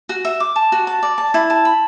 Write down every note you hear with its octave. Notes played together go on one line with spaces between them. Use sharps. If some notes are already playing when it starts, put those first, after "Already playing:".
F#4
E5
D6
A5
F#4
A5
D5
A5
E4
A5
B5